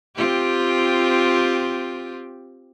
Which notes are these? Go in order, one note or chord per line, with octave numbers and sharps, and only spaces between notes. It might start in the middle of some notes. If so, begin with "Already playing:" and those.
C4 F4 G4